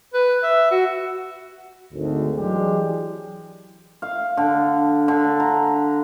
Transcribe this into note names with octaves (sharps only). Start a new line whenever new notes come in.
B4
E5
F#4
G#1 D2
E3 F#3 G#3 D4 G4
F5
D3
D3
A#5